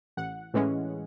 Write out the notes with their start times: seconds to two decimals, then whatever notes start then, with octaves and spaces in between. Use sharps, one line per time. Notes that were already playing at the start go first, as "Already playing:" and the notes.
0.17 A1 F#5
0.54 A2 E3 G#3 C#4